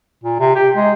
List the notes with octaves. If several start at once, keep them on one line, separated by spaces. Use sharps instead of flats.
A#2
C3
G4
G#3